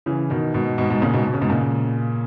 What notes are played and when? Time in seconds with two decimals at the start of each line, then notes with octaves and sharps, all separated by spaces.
0.06 C#3 E3
0.30 B2 D#3
0.54 G#2 B2
0.78 G#2 B2
0.90 G#2 B2
1.02 A#2 C#3
1.14 G#2 B2
1.26 B2
1.34 C#3
1.41 G#2 B2
1.50 A#2 C#3